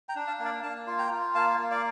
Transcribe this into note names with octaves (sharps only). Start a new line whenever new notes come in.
G5 A#5
D4
F5 A5
A#3
D5 F5
A#3 F5 A5
F4
G5 A#5
F4
A#3 F5 A5
A#3
D5 F5